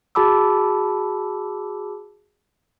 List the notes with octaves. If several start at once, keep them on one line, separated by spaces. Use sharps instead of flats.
F#4 G#4 A5 B5 D6 E6